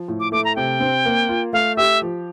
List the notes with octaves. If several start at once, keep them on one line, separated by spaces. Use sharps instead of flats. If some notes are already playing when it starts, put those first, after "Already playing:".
Already playing: F3
A2
D6
A3 D6
A#5
C3 G5
C4
A#3
F4
A3 F5
G4 E5
F3